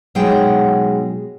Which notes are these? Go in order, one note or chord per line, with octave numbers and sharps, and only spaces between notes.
B2 F#3 G#3 D#4 G#4 G5